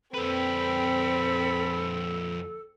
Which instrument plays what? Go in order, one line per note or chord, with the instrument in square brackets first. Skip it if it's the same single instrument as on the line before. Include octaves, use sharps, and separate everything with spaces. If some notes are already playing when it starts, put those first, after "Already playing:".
[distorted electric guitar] F2 B4 [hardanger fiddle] C4 G5 [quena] A4 [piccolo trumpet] B5